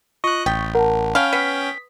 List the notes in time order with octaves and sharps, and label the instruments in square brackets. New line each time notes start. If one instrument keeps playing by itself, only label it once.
[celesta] F4 [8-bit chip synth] D#5 F#6 [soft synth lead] C#6
[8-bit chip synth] A1 [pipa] G5 [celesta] D#6 A6 B6
[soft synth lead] A#4 [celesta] F#5 A5
[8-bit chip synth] C#4 G5 [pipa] F5 [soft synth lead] B5
[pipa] B3 [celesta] F6 C7 [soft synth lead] B6
[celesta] D#6